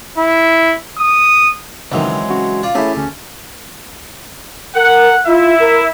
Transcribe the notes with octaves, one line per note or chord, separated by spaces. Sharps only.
E4
D#6
C#2 D#3 E3 F#3 G#3 C4
C#3 F#4
F4 D5
A3 C#4 E4 G4 G#4
D2 C#4
A#4 F#5
E4 F4 E5
A#4